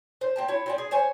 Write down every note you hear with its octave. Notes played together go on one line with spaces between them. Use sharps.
C5
C4 G5 A5
E4 C#5
C4 C#4 D5
G#4
C5 C#5 G#5